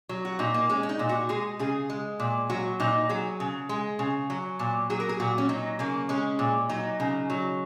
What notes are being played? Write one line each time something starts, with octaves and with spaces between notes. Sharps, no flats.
F#3
F#4
A#2 D#4
A#3
G#3 C#4
C#4
D#4
A#2
F#4
G#3 G#4
C#3 G#4
G#3
A#2
F#3 F#4
A#2 D#4
F#3 G#4
C#3
G#3
C#3
F#3
A#2
F#3 G#4
A#4
G#4
A#2 F#4
C#4
F#3 D#4
C#3 A#3
G#3 C#4
A#2
F#3 D#4
C#3
F#3